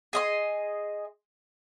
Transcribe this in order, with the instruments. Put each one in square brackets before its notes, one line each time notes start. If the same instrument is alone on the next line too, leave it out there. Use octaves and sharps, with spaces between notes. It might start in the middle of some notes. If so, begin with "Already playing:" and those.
[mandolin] G#4 D#5 C6